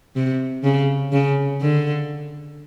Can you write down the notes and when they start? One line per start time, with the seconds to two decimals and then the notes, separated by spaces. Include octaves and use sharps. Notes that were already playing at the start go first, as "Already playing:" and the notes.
0.16 C3
0.64 C#3
1.12 C#3
1.61 D3